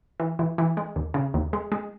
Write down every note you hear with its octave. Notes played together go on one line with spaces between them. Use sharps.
E3
E3
E3
G#3
D#2
C#3
D#2
G#3
G#3